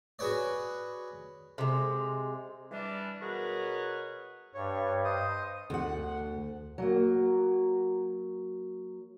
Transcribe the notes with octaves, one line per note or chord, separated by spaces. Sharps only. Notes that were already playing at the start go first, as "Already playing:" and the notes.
F#4 G#4 B4 C#5 D5
C3 G#3
E3 G3 D4
B2 F#3 G#4 A#4 B4 C#5
G2 C#5
C5 D#5 D#6
D2 F#5
F#3 A#3